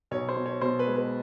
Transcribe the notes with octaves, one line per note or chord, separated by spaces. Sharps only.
B1 C#5
C5
B2
C#5
B2 C5
B4
G#3
B4